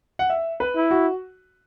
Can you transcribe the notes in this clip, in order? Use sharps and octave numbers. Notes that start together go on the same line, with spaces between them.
F#5
E5
B4
E4
F#4